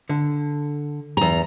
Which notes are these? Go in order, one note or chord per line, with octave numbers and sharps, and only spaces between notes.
D3
E2 A#5